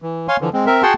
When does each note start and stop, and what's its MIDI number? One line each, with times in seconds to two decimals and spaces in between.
0.02 0.27 52
0.28 0.37 73
0.28 0.37 77
0.28 0.37 80
0.28 0.37 84
0.41 0.50 50
0.41 0.50 52
0.41 0.50 53
0.53 0.66 56
0.53 0.66 60
0.66 0.82 60
0.66 0.82 70
0.66 0.82 76
0.83 0.94 66
0.83 0.94 68
0.83 0.94 78
0.83 0.94 79
0.83 0.94 81
0.83 0.94 84